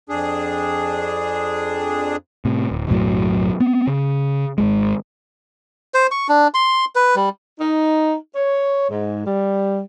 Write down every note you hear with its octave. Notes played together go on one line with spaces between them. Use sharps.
F2 D4 G#4
A2 C3
D1
B1 F#2 A2 F#3
B3 C4
C#3
G#1 D#2 G#3
C5
C#6
D4
C6
B4
G3
D#4
C#5
G#2
G3